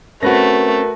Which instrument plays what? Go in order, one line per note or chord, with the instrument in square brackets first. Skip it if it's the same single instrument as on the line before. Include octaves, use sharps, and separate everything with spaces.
[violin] A3 [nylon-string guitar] C4 C#4 [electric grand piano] F#4 B4 A#6 [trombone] A#4